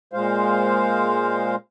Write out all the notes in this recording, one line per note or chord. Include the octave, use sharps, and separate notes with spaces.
A#2 G#3 C5 F5